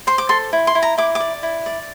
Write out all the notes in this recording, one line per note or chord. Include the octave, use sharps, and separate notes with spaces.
C5 C6
D6
A4 C6
E4
C6
E4
A#5
E4 D6
D6
D5
E4
D5